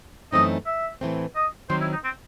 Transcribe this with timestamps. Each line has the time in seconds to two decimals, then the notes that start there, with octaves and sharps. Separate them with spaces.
0.32 F#2 E3 A3 C4 D#4 D#5
0.66 E5
1.01 A2 E3 A3 C4
1.35 D#5
1.70 D#3 F#3 C4 C5
1.81 E4
1.92 D#4
2.04 C4